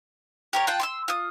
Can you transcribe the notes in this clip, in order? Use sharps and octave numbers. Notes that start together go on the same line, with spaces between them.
G4 A#4 C#5
F4 F#5 G5 A5
C6 D6 E6
F4 D#6